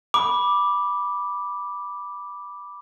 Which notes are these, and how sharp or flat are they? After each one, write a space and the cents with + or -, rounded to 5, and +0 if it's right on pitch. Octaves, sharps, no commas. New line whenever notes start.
B5 -10 D6 +0